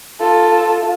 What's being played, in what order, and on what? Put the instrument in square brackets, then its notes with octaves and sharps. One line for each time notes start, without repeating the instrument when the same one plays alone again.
[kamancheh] F4 A4